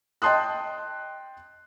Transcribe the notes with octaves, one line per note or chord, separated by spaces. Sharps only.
D#5 G5 A5 C6 D#6 F#6